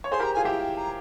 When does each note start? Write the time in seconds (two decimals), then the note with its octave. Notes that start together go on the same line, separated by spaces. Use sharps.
0.04 C#5
0.12 G#4 C5 C6
0.19 G4 A#4
0.23 A#5
0.34 F4 G#4 G#5
0.45 E4 G4 G5
0.77 A#5